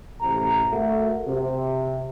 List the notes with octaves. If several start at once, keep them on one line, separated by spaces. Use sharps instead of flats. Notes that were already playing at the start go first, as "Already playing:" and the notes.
A1 A2 C3 A#5
A3 F#4 A4 A#4 E5
C3